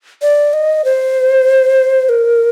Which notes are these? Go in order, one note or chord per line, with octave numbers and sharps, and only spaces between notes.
D5
D#5
C5
A#4